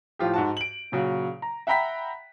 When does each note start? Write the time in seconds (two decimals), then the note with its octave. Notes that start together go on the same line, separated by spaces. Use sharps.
0.19 A2 F3 F4 G4
0.34 G#2 F#4 A5
0.57 D7 F#7
0.92 A#2 C#3 F#3
1.42 A#5
1.67 E5 F#5 G5 A#5 B5 B6